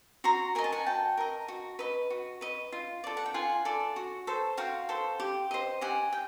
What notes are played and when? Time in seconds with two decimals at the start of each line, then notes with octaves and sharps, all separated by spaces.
0.24 F#4 A#5 C6
0.55 A#4 D#5 G#5
0.64 A5
0.72 F#5 G#5
0.86 F#4 G5 A5
1.17 A#4 D#5
1.48 F#4
1.79 B4 D#5
2.10 F#4
2.41 B4 D#5
2.72 F4
3.04 A4 D5
3.17 F#5
3.26 G5
3.34 F4 F#5 G#5
3.65 A4 D5
3.96 F#4
4.27 A4 C5
4.57 F#4 F5 G5
4.89 A4 C5
5.20 G4
5.51 C5 D#5
5.81 G4 F#5 G#5
6.13 G5